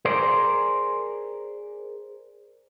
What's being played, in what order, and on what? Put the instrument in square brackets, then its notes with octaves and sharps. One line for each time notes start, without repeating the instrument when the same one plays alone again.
[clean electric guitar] G#4 A#4 C5 D5